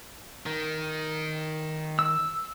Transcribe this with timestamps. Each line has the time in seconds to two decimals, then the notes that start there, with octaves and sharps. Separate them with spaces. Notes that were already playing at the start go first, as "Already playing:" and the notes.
0.46 D#3
1.99 E6